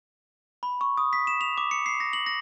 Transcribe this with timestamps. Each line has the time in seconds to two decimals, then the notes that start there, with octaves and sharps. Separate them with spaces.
0.63 B5
0.81 C#6
0.98 D#6
1.13 B6
1.27 E7
1.41 F7
1.57 D6
1.71 C#7
1.86 C7
2.00 A#6
2.13 F#7
2.26 A#6